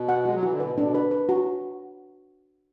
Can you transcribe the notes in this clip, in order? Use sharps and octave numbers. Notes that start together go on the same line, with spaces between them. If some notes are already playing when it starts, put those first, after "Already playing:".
Already playing: B2
F#5
G#3 F#4
F#3
E3 F#4
D3
B2 B4
A2
D4
B2
B4
B4
F#4